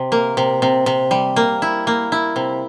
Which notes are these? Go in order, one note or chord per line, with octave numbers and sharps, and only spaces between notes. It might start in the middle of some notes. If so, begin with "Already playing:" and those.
Already playing: C3
A#3
C3
C3
C3
G3
A#3
E4
A#3
E4
C3